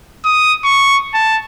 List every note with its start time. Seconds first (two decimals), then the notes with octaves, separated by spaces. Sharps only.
0.25 D#6
0.64 C#6
1.14 A5